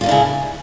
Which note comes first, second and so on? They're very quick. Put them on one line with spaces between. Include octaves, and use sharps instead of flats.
F4 A#3 D4 E4 C#3